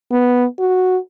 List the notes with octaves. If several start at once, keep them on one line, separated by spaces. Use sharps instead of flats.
B3
F#4